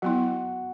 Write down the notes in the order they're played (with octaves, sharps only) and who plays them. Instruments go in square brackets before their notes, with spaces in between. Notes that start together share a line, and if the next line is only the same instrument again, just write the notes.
[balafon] F#3 B3 E4 [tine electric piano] F#4 F#5